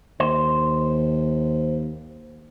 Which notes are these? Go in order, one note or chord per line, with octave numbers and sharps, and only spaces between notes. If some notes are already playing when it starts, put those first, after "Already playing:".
D#2 C5